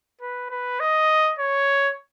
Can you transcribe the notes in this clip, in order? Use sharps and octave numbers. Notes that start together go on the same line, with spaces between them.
B4
B4
D#5
C#5